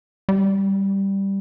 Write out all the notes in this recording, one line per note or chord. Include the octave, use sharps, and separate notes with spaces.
G3